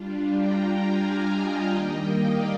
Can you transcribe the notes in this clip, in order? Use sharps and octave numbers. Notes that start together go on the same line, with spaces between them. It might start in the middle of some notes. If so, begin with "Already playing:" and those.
Already playing: G3 D4 F4
G5 A#5
F5 G#5
D#5 G5
D#3 G3 A#3
D5 F5